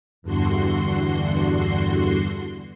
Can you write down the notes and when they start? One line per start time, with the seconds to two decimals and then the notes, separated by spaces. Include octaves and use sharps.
0.22 E2 G2 D3 F#4 C6